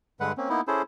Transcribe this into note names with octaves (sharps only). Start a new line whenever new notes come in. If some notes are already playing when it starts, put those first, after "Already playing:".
G2 D3 G#3 B4 F#5
A#3 C4 C#4
A#3 B3 D#4 E4
C#4 E4 G#4 A4 C5